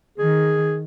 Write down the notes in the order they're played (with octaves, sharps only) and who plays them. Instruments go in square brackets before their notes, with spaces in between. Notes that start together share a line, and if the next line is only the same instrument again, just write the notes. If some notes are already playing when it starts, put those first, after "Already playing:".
[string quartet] D#3 [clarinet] G#4